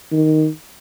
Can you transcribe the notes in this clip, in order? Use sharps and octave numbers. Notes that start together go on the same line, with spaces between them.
D#3